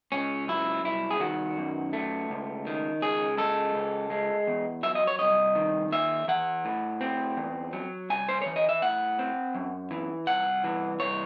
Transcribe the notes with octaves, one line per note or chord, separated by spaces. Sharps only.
C#2 C#4
F#3 E4
C2 E4
G#4
D#3 F#4
F#2
A3
C#2
D#3
C#2 G#4
G#3 A4
C#2
G#3
E2
F#3 E5
D#5
C#5
C2 D#5
D#3
D#2 E5
E3 F#5
A2
C4
E2
F#3
C2 G#5
C5
E3 C#5
D#5
E5
A2 F#5
C4
F#2
E3
C2 F#5
E3
C2 C#5